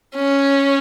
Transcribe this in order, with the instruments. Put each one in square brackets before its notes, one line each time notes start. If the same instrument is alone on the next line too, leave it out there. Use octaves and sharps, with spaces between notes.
[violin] C#4